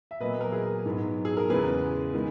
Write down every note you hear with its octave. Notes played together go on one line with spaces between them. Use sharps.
E5
A#2 F#3 B3 B4 D#5
A#4
G#4
G#2 F#3 B3
G#4
A#4
E2 C#3 G#3 B3 G#4 B4
D#3 G#3 B3